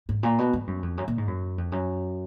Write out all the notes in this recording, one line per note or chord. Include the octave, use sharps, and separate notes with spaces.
G#2
A#2
B2
G#2
F#2
F2
F#2
A#2
G#2
F#2
F2
F#2